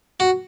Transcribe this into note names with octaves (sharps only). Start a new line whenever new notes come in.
F#4